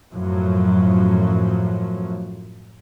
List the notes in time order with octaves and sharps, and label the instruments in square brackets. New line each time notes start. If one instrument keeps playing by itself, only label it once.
[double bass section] F#2 A2 F3 F#3